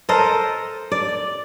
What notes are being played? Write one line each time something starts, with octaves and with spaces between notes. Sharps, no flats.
A4 A#4 C5 D#5
D5